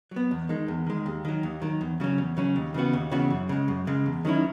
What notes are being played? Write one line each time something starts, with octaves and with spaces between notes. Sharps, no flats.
F#3 B3
E2
D#3 G#3
E2
D#3 G#3
D#2
D#3 F#3
D#2
D#3 F#3
E2
C#3 F#3 C#4
E2
C#3 F#3 C#4
D#2
C#3 E3 B3 F#4
D#2
C#3 E3 B3 F#4
F#2
C#3 G#3
F#2
C#3 G#3
E2
D#3 F#3 C#4 E4